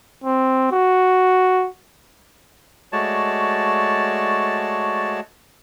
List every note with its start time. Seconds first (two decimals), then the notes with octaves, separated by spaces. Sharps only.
0.24 C4
0.72 F#4
2.93 G#3 A3 F#4 C#5 D5 A5